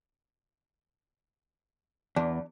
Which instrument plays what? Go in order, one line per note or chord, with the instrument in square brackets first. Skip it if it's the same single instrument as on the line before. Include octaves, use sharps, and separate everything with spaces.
[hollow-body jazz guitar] E2 [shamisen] D4